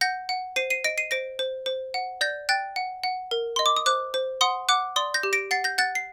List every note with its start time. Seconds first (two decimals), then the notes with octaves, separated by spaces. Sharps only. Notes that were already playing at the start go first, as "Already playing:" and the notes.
0.01 F#5 G6 A#6
0.29 F#5
0.56 C5 C7 D#7
0.70 C7 D#7
0.84 D#5 A#6 D7
0.98 C7 D#7
1.11 C5 A#6 D7
1.39 C5
1.66 C5
1.94 F#5
2.21 D5 G6 A#6
2.49 G5 F#6 A6
2.76 F#5
3.04 F#5
3.31 A#4
3.56 D#5 C6
3.66 D6
3.76 D#6
3.86 C5 D6 F#6
4.14 C5
4.41 F#5 C6 D#6
4.69 F#5 D6 F#6
4.96 D5 C6 D#6
5.14 G6 A#6
5.23 G4
5.33 A#6 D7
5.51 F#5 A6 C7
5.64 G6 A#6
5.78 F#5 F#6 A6
5.95 C7